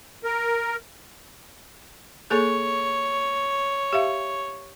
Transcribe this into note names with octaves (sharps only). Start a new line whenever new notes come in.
A#4
A#3 G#4 A4 C#5
G4 E5 F5